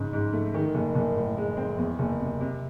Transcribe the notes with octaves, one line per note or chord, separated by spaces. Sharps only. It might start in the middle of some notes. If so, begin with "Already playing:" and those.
Already playing: G#2 C#3
G#2
A3
D#3
F#1
F#1
A2
G#3
C4
E2
F#1
C3
C3